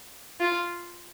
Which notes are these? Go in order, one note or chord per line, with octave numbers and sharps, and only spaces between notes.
F4